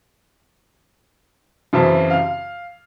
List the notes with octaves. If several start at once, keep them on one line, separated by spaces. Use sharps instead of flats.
F#2 C#3 E3 C4 E5 A5
F5 F6